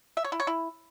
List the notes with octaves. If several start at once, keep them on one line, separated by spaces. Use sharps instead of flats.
E5
C#5
E4
C#5
E4